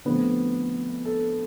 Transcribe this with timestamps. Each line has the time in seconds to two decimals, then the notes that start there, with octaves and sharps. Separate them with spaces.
0.05 D3 F3 A3 B3 C4 B4
1.05 A4